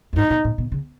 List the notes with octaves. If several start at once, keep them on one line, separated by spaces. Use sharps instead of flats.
F#2
G#2 D#4
B2
A2
B2
C#3